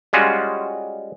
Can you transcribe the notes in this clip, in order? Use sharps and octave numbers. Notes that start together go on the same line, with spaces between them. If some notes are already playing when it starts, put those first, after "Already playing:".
G3 G#3 C#4 F4 F#4